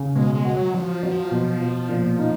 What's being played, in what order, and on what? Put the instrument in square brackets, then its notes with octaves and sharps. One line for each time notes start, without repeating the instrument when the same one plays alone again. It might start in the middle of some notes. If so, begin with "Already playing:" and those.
Already playing: [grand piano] C#3
[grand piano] B2 [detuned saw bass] G#3
[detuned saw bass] G#3
[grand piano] F#4
[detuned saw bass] F#3
[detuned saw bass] F3 [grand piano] F#3
[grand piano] F#3
B2
B2
A#2
D#4